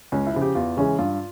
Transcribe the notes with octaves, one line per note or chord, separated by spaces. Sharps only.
C#2 C#4
E4
C#3 F3
G4
E2 F4
C#3 E3 G#3 C#4
G2 F4